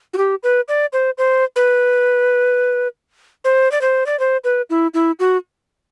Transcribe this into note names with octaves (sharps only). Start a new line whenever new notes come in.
F#4
G4
B4
D5
C5
C5
B4
C5
D5
C5
D5
C5
B4
E4
E4
F#4